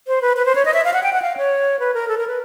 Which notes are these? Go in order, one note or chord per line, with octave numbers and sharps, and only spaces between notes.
C5
B4
B4
C5
C#5
D#5
E5
F5
F#5
G5
F#5
F5
C#5
B4
A#4
A4
A#4
B4